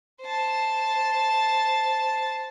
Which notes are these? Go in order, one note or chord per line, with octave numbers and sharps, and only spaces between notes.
C5 A5